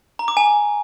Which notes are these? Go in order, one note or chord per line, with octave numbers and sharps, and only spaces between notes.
A#5
D6
G#5